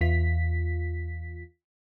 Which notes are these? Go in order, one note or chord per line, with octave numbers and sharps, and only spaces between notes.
E2 F4 B6